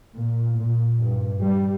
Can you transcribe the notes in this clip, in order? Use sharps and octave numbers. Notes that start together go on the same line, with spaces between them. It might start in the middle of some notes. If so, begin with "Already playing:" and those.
A#2
A#2
G2
G3